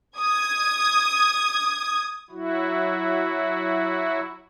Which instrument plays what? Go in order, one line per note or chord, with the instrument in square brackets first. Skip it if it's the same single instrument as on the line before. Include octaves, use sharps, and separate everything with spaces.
[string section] D#6 G#6
[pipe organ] F#3 E4 F#4